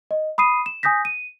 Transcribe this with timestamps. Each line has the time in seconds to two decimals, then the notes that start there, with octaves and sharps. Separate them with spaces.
0.11 D#5
0.38 B5 D#6 C7 D#7
0.66 E7
0.83 G#5 D#6 G6 A#6 B6
1.05 D#7